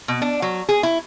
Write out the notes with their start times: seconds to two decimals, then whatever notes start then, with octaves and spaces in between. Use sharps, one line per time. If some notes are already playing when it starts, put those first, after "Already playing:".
0.08 B2
0.22 D4
0.42 F#3
0.69 G#4
0.83 E4